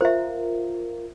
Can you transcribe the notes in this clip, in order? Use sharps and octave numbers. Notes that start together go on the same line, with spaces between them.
F4 A#4 C5 E5